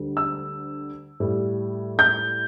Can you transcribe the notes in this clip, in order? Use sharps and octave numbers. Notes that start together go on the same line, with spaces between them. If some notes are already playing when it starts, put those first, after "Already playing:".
Already playing: D2 D3 G3
E6
A2 G3
G6